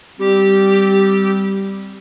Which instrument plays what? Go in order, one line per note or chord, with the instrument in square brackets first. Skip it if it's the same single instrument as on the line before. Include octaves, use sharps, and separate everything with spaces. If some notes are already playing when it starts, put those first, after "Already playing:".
[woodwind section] G3 C4 [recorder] G4